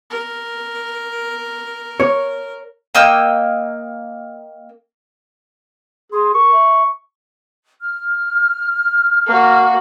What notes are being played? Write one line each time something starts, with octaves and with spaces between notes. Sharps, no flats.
A#4
C#5
A#3 D#5 G5 E6
G#4 C6
A#4 C#6
E5
F6
A#3 F#4